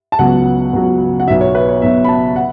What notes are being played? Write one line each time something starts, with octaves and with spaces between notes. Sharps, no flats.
A5
C#2 C#3 F#3 B3 F#5
C#2 C#3 F#3 B3
F#5
B1 B2 F#3 B3 E5
C#5
B4
C#5
B1 B2 F#3 B3 E5
B5
A5
F#5